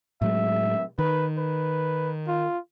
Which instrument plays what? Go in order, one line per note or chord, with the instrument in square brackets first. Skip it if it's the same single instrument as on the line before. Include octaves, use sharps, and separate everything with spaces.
[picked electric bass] A2 F#3 G#3 [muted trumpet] E5
[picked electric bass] D#3 [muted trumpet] B4
[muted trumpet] B4
F4